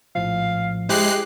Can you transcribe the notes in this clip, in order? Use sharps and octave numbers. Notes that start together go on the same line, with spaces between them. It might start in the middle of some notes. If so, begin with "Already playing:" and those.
A#1 A2 F3 F5
G#3 E4 G4 C5 F#6 C7